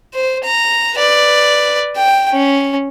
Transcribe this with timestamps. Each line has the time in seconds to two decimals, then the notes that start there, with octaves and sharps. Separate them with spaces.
0.14 C5
0.44 A#5
0.95 B4 D5
1.97 G5
2.32 C#4